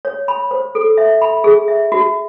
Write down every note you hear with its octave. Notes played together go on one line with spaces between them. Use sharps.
C#5
B5
C5
A4
E5
B5
G#4
E5
F#4